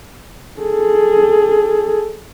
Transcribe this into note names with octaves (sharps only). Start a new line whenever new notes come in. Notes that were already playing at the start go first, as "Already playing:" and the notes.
G#4 A4